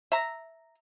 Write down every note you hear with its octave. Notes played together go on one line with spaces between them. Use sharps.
E5 A#5